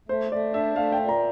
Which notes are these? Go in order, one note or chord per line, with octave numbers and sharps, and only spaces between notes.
A3 C5
A3 D5
D4 E5
A3 F5
G5
A#2
A#5